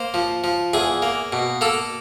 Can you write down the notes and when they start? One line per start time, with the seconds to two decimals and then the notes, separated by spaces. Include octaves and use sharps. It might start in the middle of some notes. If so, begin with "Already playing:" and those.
Already playing: A#3 C5
0.14 F3
0.44 F3
0.74 E2 G#4
1.02 A#3
1.32 B2
1.61 A#3 A4